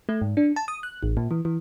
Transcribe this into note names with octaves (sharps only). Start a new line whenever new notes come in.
A3
G#2
D4
A5
D#6
F#6
A1
A#2
E3
E3